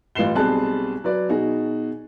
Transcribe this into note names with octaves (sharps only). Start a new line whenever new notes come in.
A1 F4 B4 C7 E7 G7
B1 G3 C4 G#4 A5 F#6
F#3 B4 D5
B2 D#4 F#4 G#4